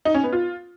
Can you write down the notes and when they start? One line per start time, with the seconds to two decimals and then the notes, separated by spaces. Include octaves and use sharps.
0.05 D#4
0.14 C#4
0.24 B3
0.33 F4